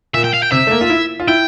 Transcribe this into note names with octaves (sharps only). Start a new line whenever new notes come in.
A#2 E5
G5
F5
G5
C3 E5
A3
A#3
F4
E4
F4
E4 G5